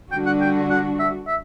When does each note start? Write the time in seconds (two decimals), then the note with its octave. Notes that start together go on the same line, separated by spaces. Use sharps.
0.12 D3 G3 D4 F#4 G5
0.26 F#5
0.41 G5
0.70 F#5
0.99 E5
1.27 E5